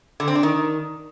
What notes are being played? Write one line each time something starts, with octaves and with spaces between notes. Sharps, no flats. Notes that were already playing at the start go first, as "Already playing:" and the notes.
D3
C4
D4
D#3